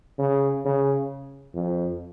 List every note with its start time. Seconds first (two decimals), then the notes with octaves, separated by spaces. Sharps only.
0.19 C#3
0.65 C#3
1.54 F2